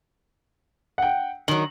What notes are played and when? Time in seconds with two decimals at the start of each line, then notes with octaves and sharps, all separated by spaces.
0.98 F#5 G5
1.48 D#3 F#3 F#7